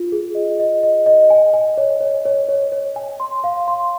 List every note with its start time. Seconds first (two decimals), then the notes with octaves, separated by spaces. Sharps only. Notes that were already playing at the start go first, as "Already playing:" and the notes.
Already playing: F4
0.12 G#4
0.35 D#5
0.60 D#5
0.83 D#5
1.06 D#5
1.30 G#5
1.54 G#5
1.78 C#5
2.01 C#5
2.26 C#5
2.49 C#5
2.72 C#5
2.96 G#5
3.20 C6
3.44 F5
3.68 C6